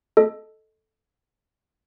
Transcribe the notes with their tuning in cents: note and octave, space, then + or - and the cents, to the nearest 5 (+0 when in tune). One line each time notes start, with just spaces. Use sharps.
A4 -5 D#5 +0